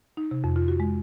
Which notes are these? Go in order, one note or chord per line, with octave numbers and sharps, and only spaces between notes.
D#4
C3
F2
F4
F#4
G#3